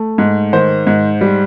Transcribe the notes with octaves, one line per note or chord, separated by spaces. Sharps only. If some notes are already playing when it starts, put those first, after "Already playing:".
Already playing: A3
G#2
D#3 C5
G#2
G3